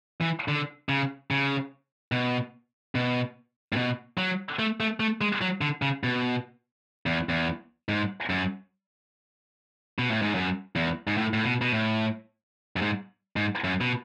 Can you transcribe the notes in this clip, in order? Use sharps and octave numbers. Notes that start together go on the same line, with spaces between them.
E3
D3
C#3
C#3
B2
B2
A2
B2
F#3
A3
A3
A3
G#3
F#3
D3
C#3
B2
E2
E2
G#2
F#2
B2
A2
G#2
F#2
E2
G#2
A2
A2
B2
B2
A2
F#2
G#2
G#2
F#2
B2